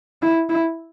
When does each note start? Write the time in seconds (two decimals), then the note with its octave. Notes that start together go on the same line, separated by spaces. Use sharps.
0.22 E4
0.49 E4